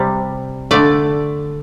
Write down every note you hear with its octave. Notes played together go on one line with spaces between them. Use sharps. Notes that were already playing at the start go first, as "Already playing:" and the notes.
Already playing: C3 G3
D3 A3 D5